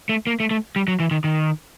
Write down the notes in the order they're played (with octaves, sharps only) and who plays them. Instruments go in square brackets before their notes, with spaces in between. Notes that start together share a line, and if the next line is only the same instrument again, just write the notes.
[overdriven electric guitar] A3
A#3
A3
A3
G3
F#3
E3
D#3
D#3